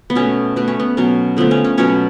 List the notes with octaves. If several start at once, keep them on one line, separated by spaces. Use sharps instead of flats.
B3
B2 A3 C#4
B2 A3 B3
C#4
B3
B2 F#3 B3 C#4
D3 F3 A3 B3
C#4
C#4
B2 F#3 B3 C#4